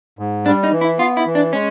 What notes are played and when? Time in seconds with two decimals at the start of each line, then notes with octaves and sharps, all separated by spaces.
0.19 G#2
0.46 G3 D4
0.64 D#4
0.73 E3
0.81 E4
0.99 B3 F4
1.17 E4
1.26 E3
1.35 D4
1.53 G#3 C#4